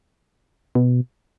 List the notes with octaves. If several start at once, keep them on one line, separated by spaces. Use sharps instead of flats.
B2